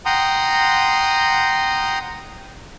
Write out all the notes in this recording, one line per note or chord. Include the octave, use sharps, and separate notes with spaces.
F#5 G5 A#5 C6 D#6